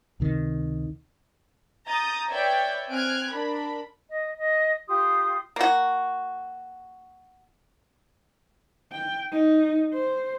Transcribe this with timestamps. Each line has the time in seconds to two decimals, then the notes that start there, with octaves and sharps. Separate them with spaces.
0.20 C#2 C3 D#3
1.88 A#5 D#6 G6 A6
2.30 B4 C#5 D5 E5 G5
2.89 C4 G#5 F6 F#6 G#6 D7
3.29 D4 A#4 B5
4.08 D#5
4.38 D#5
4.88 F4 G4 C6 D#6
5.56 A#3 F#4
8.92 G5
9.32 D#4
9.94 C5